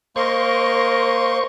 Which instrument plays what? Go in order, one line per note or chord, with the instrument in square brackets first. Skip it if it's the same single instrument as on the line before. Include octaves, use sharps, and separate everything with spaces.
[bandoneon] A#3 C6 [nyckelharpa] A#4 D#5 [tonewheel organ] C5 C#6